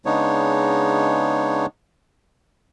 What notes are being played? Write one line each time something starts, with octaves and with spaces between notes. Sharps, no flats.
C#3 G#3 B3 D4 D#4 C#5